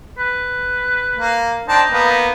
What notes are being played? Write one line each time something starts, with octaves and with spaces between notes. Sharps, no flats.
B4
A#3
C4 D4 D#4 A5
A#3 B3